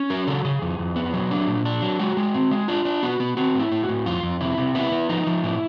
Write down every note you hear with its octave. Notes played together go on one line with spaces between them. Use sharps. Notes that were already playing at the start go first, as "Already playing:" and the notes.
Already playing: C#4
F#3 A#4
C#3 A4
C#3 G#4
F2
F2
B3
F#3
D4
A#2
D4
F#3
G#3 F#4
G#3
C4
G#3
D4 F4
D4
B3 F#4
B3
C4 F#4
A2 E4
A2
F#4
A2
F2 F4
F2
C3 E4
C3
B3 E4
B3
F3 D#4
F3
A2 E4